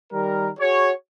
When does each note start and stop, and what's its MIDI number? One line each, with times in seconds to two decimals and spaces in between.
0.12 0.49 51
0.12 0.49 55
0.12 0.49 70
0.59 0.92 66
0.59 0.92 68
0.59 0.92 73